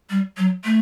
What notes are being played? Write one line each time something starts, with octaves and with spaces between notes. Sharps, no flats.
G3
F#3
A3